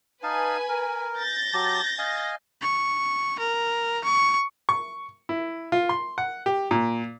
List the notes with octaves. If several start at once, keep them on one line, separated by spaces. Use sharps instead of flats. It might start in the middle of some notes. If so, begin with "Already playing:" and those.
D#4 B4 F5 G#5 A5
A#4
G6 A6 A#6
F#3 G4 A5
D#5 F5 G#5
C#6
A#4
C#6
C#6
E4
F4
C6
F#5
G4
A#2